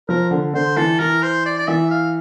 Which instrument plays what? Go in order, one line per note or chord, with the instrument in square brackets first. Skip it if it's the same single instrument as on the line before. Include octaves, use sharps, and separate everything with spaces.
[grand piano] F3 [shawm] A#4
[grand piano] D3
[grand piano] D3 [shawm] C5
[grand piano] E3 [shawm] A4
[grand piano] E3 [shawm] A#4
[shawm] C5
D5
D5
[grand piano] E3 [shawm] E5
[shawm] F5